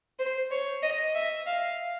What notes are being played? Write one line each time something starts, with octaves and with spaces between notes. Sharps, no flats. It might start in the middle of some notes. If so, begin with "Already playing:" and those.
C5
C#5
D#5
E5
F5